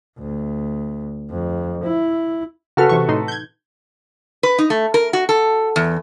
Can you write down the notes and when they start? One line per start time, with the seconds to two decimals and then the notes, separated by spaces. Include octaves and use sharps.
0.19 D2
1.30 F2
1.84 E4
2.77 C#3 F#4 A4 B4 F6
2.89 C3 E3 C#6
3.08 A2 D#4 C6
3.28 G6 G#6
4.43 B4
4.58 D#4
4.70 A3
4.94 A#4
5.13 F#4
5.29 A4
5.76 E2